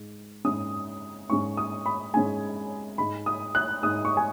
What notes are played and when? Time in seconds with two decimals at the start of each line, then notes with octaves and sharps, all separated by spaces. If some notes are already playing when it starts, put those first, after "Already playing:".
Already playing: G#2 G#3
0.45 G#2 G#3 C#4 D#6
1.30 G#2 G#3 C#4 C#6
1.57 D#6
1.86 B5
2.14 G#2 G#3 C#4 G#5
2.98 G#2 G#3 D#4 B5
3.26 D#6
3.55 F#6
3.82 G#2 G#3 D#4 D#6
4.05 C#6
4.17 G#5